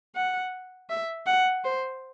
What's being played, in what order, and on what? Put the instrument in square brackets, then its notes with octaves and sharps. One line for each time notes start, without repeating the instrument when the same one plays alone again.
[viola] F#5
E5
F#5
C5